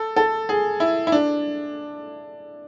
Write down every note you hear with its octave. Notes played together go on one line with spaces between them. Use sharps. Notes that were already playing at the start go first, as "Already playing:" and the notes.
Already playing: A4
A4
G#4
E4
E4
D4